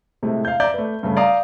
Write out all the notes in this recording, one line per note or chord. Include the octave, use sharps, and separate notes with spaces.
A2 C3 G#3 A3
F5 G6
D5 E5 A#5 G6
A3 B4
G2 C#3 A3
D5 F5 A#5 D#6